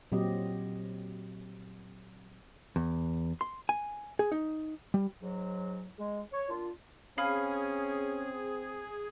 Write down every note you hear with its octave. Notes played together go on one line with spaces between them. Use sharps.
A#2 F#3 C4 G4 D#5
E2
C6
G#5
G#4
D#4
G3
G#2 F#3
G#3
C#5
A#3 D4 F4
C4 C#4 G#4 F5 B5 F6